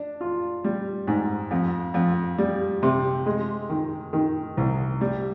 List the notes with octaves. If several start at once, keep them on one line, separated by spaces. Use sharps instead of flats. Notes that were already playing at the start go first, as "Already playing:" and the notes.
Already playing: D4
F4
G3
G#2
F2
F2
G3
C3
G#3
D#3
D#3
C2
G3